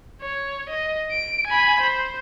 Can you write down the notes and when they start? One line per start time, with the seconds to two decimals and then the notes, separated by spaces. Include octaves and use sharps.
0.22 C#5
0.70 D#5
1.12 D7
1.47 G#5 B5
1.81 C5